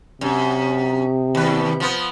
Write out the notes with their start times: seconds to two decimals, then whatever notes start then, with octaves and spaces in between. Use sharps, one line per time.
0.21 F#2 C3
1.35 D#2 B4
1.80 F3 B3